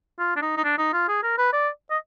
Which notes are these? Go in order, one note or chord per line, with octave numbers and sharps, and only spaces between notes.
F4
D4
D#4
D#4
D4
D#4
F4
G#4
A#4
B4
D5
D#5